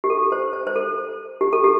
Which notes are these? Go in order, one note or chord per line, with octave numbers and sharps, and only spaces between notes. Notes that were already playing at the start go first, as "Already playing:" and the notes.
G4
A4
C5
C5
C5
A4
G4
A4
G4